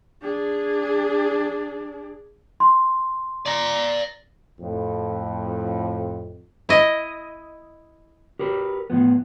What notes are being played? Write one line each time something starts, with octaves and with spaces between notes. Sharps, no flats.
D4 G#4
C6
D5 A#5
F2 A2
E4 D#5
G4 A#4 B4
E2 A2 F3 B3